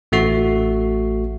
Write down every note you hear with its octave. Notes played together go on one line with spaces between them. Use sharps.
A1 A3 F#4 C7